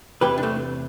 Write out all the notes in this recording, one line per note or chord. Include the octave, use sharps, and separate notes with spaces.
E2 C3 E3 G4 B4
D4
A3 C4